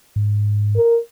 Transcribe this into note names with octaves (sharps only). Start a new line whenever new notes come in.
G#2
A#4